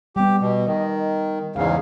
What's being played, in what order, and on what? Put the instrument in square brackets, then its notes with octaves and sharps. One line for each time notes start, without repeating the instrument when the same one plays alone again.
[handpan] G3 B3 [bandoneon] G4
[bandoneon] B2
[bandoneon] D#3 [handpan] D#5
[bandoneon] E2 G#2 C#3 [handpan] F5